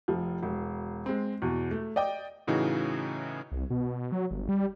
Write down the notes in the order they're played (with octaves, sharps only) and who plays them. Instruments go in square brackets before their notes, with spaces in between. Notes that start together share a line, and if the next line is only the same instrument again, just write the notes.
[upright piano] F1 F3
E1
G#3 C4
E2 B2
A3
D5 D#5 G5 D6
[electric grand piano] A2 C#3 E3 D#4 F#4
[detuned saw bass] C2
B2
F#3
G1
G3